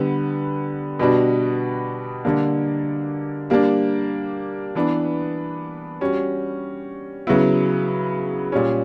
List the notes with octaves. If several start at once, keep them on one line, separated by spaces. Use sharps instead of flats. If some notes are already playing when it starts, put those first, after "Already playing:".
Already playing: D3 G3 B3
B2 G3 B3 D4 F#4
D3 G3 A#3 D4
G3 A#3 D4
E3 B3 D4
G3 C#4 F#4
C#3 F#3 B3 E4
A#2 G3 C#4